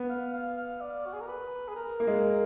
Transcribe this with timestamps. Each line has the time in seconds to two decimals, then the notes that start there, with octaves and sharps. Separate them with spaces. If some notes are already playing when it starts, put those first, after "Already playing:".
Already playing: B3
0.10 F5
0.34 F5
0.57 F5
0.81 D5
1.06 F#4
1.14 G#4
1.21 A#4
1.28 B4
1.68 G#4
1.76 A#4
2.00 A#3
2.07 G#3